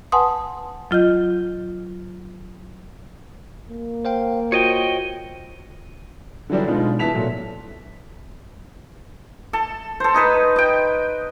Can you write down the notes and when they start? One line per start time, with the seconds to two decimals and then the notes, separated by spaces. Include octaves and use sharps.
0.12 B4 F#5 G#5 A5 C6 D#6
0.91 F#3 F4 D#5 G6
3.69 A#3
4.05 C5 F5 G5
4.52 F4 F#4 C5 C#5 D#5 G5
6.50 D3 E3 F#3 G3 D4
6.67 B2 G#3 D4 D#4 F4
6.99 B2 E3 E4 A5 B6 F7
7.14 A#2 F#3 A3
9.53 A4
10.00 A4 C5
10.14 D#4 G#4 B4
10.56 D#5 G5